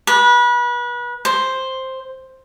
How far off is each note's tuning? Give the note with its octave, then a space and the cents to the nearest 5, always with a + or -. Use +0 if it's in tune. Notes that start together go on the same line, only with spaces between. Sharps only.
B4 -30
C5 +5